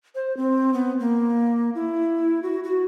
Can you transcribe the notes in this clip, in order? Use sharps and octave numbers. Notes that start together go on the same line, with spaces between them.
C5
C4
B3
A#3
E4
F#4
F#4